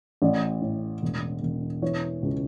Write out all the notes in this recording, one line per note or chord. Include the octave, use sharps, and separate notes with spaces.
A1 D5
A2
E1
E1
E3 C#5
C#2